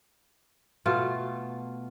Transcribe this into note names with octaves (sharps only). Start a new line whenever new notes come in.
B2 A3 F4